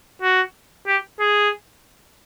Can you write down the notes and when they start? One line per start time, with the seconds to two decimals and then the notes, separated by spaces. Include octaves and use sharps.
0.22 F#4
0.87 G4
1.20 G#4